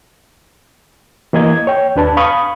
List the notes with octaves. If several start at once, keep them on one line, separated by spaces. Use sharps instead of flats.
E3 A#3 D#5 G#6
C#5 G5
D#2 D4 B4 A5
F5 B5 C#6 D#6